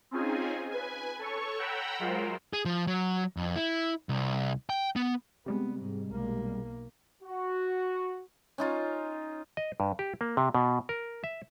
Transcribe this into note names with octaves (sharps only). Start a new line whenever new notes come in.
C4 C#4 D#4 F4 G#4 G#5
B4 G#5
A4 C#5 C#6
F#5 G5 A#5 B5 E6
F#3 G#3 F4 A#4 C5
G#4
F3
F#3
F2
E4
C2
G5
B3
C3 G3 G#3 B3
G#2
B1 A#3
F#4
C#4 D#4 F4
D#5
G2
G4
A#3
C3
B2
A#4
E5